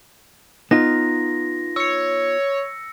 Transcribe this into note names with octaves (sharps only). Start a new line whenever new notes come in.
B3 D#4 F4 A#6
C#5 E6 C#7